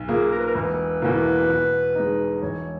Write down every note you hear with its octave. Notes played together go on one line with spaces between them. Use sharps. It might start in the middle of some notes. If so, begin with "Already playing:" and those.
Already playing: B1
A#2 A#3 G#4
A#4
B4
A#4
E1 B4
E2 B2 A#3
B2
G#3 D#4
E1 C#5